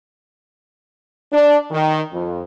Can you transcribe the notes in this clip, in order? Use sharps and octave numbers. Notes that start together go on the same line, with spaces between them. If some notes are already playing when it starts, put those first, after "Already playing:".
D4
D#3
F2